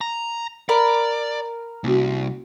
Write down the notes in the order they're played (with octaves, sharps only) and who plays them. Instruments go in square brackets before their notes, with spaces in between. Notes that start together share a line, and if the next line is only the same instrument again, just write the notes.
[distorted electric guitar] A#5
[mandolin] A#4 B5 [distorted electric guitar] D5
[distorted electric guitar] C2 [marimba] A#3 C#4 F#4